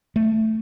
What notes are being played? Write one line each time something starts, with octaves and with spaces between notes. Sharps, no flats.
A3